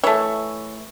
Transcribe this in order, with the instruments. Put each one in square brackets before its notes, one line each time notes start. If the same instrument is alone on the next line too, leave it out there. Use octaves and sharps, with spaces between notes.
[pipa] E3 A3 C#5